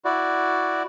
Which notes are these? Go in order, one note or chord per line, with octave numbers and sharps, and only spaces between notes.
E4 F#4 D5